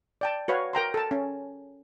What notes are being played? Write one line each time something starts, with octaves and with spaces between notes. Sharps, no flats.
D5 G5 A5
F#4 B4 C#5 F5
A#4 G5 A#5 C6
A4 A5
C#4